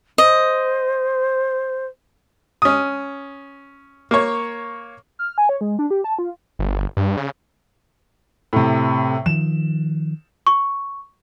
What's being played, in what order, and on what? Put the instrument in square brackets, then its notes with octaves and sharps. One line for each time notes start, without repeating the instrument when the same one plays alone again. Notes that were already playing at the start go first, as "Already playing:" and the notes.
[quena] C5 [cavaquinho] D#5
[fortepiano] C#4 D#6
A#3 C#5
[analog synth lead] F6
G#5
C#5
G#3
D4
G4
A5
F4
[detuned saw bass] G1
G2
C#3
[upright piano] A2 C3
[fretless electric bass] D#3 F3 [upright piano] E7
[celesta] C#6